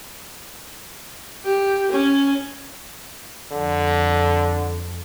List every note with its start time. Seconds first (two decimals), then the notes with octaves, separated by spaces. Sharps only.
1.45 G4
1.91 C#4
3.52 F2 D3